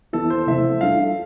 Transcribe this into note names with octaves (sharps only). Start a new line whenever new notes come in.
E3 B3 E4 A4
C5
C3 F3 A3 E4 A4 E5
G3 D4 F4 A4 F5